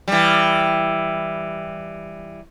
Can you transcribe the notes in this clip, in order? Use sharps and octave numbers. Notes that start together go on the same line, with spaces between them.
E3 G3